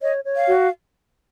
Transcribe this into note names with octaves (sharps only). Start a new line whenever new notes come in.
C#5 D#5
C#5
F5
F#4